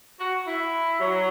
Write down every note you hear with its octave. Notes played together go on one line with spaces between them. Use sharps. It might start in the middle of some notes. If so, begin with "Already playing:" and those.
F#4
E4
F#3